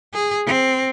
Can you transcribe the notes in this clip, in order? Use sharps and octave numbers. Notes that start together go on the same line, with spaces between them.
G#4
C4